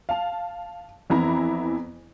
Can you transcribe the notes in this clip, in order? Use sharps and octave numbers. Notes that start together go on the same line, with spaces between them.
F5 A5
F2 E3 B3 E4 A#5